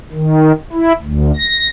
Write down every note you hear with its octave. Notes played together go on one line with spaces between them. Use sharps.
D#3
E4
D2
A#6